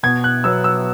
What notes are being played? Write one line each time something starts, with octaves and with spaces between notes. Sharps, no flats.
B2 G#6
F#6
F#3 B3 E6
E6